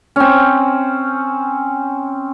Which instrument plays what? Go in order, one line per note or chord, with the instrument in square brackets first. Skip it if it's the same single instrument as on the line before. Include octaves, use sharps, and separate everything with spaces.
[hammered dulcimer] C4 C#4